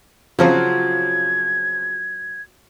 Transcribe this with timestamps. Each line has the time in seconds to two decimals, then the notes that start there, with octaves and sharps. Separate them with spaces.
0.39 C#3 F3 F#3 C4 F4 F#4 G#6